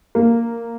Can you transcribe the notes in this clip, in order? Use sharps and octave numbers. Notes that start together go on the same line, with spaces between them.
A#3